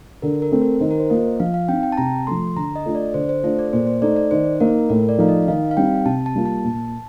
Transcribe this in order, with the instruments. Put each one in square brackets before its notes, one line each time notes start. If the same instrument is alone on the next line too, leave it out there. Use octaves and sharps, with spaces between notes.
[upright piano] D3 [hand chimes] A#4
[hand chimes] A#4
[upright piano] A3 C4
[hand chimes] A#4
[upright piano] D#3 [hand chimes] C5
[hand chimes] A#4
C5
[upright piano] A#3 F4 [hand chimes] D#5
[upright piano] F3 [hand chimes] F5
[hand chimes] F5
[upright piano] C4 D#4 [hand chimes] G5
[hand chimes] G5
A5
[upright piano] C3 [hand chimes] A#5
[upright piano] F3 A3 [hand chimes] C6
[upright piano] D3 [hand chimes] A#5
[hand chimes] D#5
[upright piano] A3 D4 F4
[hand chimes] D5
[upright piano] D3 [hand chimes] C5
[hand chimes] C5
[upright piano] A3 D4 F4 [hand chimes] A4
[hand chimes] D5
[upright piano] A#2 [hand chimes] C5
[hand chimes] C5
[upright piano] A3 D#4 [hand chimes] D5
[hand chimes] D5
[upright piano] D#3 [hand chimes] C5
[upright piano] A#3 D#4 [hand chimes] A#4
[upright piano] A2 [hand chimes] A#4
[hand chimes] D5
[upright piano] F3 A3 D#4 [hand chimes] F5
[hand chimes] D#5
[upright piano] D#3 [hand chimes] F5
[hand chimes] F5
[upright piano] G3 C4 D#4 [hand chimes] G5
[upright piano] C3 [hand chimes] A5
[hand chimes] A5
[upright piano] G3 A#3 F4
[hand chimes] A5
[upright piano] A#2